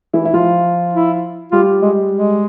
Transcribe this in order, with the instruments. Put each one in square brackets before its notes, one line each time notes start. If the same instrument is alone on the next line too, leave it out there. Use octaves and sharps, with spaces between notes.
[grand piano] E3 E4
E4
F3 F4
[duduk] E4
[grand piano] G3 G4 [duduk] F4
[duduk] G#3
G#3